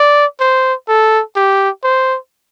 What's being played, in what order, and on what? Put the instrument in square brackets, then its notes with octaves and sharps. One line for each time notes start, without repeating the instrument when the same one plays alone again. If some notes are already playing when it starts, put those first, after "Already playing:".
Already playing: [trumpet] D5
C5
A4
G4
C5